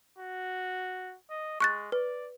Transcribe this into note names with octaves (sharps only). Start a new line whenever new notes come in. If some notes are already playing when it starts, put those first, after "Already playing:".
F#4
D#5
G#3 C#6 F#6 A6
B4 D5